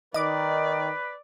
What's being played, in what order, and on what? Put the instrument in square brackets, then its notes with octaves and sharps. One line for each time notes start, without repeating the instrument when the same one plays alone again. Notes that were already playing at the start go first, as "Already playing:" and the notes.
[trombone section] D#3 [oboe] B4 [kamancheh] D5 [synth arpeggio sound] D#5 D6